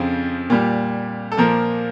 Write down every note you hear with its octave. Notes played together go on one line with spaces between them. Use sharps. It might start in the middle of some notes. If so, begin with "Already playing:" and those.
Already playing: F2 C#3 F3 C4
A#2 G3
A4
A#2 F3 A#3 A#4